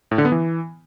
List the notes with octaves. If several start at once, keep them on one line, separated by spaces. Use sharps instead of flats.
A2
D3
B3
E3